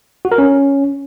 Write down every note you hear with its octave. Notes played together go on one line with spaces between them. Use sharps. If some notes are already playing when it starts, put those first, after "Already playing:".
F#4
A#4
C#4